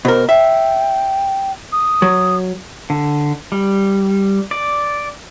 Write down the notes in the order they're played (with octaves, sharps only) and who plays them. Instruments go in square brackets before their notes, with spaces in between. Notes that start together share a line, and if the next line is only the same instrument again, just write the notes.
[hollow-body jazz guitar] B2 A#4 [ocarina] C5
[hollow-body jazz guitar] E5 [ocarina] G5
[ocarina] D#6
[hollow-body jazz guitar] F#3
[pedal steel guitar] D3
G3
D5